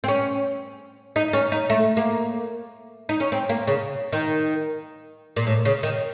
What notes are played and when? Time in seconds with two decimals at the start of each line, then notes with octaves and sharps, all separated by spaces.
0.04 C4
0.08 C#4
1.16 D#4
1.33 C#4
1.52 D#4
1.70 A3
1.97 A#3
3.09 D#4
3.20 C#4
3.32 C4
3.49 A#3
3.67 C#3
4.13 D#3
5.36 A#2
5.47 A2
5.65 C#3
5.83 D#3